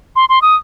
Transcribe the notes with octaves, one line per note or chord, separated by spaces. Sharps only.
C6
C6
D#6